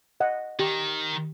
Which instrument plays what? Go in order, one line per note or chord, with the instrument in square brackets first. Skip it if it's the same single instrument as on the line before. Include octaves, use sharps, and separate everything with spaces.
[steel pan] D#5 F#5
[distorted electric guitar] D#3 [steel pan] G4